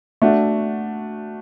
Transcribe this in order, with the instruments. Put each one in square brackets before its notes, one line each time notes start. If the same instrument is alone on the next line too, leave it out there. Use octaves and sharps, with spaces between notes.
[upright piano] A3 D4 F#4